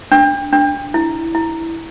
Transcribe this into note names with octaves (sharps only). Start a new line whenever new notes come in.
D4
D4
E4
E4